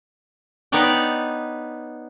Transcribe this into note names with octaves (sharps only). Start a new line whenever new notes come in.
B3 D#4 C#5 D5 G5